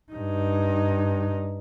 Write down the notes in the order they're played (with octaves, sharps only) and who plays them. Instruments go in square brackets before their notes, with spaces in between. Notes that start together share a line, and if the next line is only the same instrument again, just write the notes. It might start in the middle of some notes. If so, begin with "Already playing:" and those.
[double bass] G2 D#4